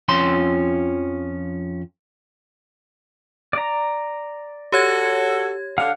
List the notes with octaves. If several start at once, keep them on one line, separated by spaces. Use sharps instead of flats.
F2 F3 C#4 C6
D5 A#5
F#4 G4 A4 C#5 G#6
D3 F5 F#5 F6